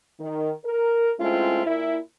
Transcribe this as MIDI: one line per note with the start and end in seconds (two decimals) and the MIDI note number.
0.19 0.51 51
0.65 1.11 70
1.20 1.64 56
1.20 1.64 57
1.20 1.64 60
1.20 1.64 61
1.20 1.64 64
1.20 1.64 65
1.65 1.96 46
1.65 1.96 64